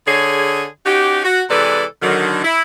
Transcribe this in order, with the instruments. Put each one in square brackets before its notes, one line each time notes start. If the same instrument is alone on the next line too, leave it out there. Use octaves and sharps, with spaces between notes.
[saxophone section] D3 G#4 C#5
C#4 D#4 F#4 G4
F#4
C3 E3 G#3 A4 B4 D5
D3 D#3 F#3
E4